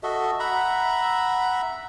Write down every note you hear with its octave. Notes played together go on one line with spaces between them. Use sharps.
F#4 A4 D#5 E5
E5 F#5 A#5 B5